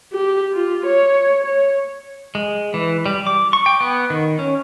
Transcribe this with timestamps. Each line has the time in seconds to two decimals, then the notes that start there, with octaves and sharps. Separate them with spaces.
0.13 G4
0.54 F4
0.86 C#5
1.44 C#5
2.35 G#3
2.74 E3
3.06 G3
3.27 D6
3.53 C#6
3.66 G5
3.81 B3
4.10 D#3
4.39 C#4